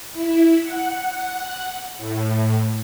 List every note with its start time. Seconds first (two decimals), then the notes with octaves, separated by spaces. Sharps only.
0.13 E4
0.62 F#5
1.98 A2